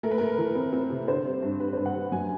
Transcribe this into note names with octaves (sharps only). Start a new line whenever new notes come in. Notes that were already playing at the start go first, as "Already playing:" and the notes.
A3 A#4
B4
A3 A#4
E3
C4
C4
C3
D3 C5
G3
G2
G2 B4
G2 C5
F#5
G2
F#2 G#5